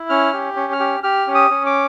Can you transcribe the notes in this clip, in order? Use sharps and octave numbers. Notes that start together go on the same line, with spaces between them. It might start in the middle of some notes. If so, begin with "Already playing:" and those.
Already playing: E4
C#4 F6
G4
C#4
F6
G4
G4 F6
C#4
D#6
C#4
D6